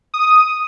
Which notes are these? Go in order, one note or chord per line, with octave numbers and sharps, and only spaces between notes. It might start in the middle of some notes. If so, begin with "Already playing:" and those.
D#6